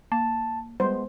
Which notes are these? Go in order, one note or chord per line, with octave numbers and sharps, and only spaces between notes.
A#3 A5
G3 G#3 B3 C5